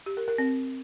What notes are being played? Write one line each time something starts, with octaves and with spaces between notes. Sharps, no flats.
G4
A#4
A#4
C4